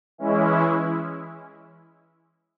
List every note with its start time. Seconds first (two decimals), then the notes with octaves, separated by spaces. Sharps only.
0.18 E3 G#3 C#4 E4